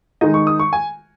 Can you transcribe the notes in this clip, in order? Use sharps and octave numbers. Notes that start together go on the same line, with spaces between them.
D#3 G#3 D#4 D#5
C#6
D#6
C#6
G#5